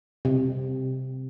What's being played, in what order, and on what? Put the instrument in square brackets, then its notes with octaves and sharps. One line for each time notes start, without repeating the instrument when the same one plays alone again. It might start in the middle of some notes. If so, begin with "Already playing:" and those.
[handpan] C3